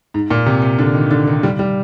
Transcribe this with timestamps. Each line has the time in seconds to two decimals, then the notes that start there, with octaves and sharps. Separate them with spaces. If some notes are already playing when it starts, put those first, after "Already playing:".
0.14 G#2
0.31 A#2
0.46 C3
0.62 C3
0.79 D3
0.95 D#3
1.11 D3
1.27 D#3
1.43 G3
1.59 G3